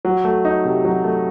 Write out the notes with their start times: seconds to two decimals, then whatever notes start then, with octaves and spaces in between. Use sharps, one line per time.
0.05 F#3
0.24 A3
0.45 D#4
0.65 C3
0.85 F#3
1.04 A3